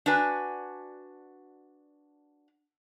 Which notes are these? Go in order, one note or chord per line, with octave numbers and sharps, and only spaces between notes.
D4 F#4 B4 G#5